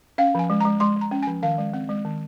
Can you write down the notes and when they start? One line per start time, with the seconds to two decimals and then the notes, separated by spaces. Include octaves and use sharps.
0.18 C#4 F5
0.35 F3 G#5
0.50 G#3
0.60 A#5
0.65 G#3
0.80 G#3 C6
0.96 G#3 A#5
1.11 C#4
1.23 G#5
1.27 F3
1.43 D#3 F5
1.58 G#3
1.73 C4
1.89 G#3
2.05 D#3